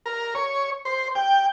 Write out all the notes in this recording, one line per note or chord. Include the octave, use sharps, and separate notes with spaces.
A#4
C#5
C5
G5